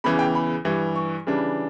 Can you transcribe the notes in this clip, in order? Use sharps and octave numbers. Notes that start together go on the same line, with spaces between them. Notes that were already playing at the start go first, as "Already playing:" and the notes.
E2 C#3 E3 B5
G5
B5
G2 E3 G3
C#6
C#3 E3 G3 D4